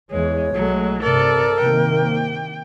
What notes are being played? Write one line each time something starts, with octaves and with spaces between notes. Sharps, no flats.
E2 E3 G#3 C#5
B1 F#3 G#3 A3
G2 C3 A4 A#4 D5
C3 D#3 A#3 G5